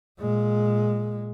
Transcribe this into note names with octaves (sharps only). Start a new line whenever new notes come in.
A#2 G#3